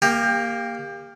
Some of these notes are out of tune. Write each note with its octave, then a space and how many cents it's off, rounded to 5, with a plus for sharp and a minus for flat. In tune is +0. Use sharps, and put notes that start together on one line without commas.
A#3 +0 G4 +30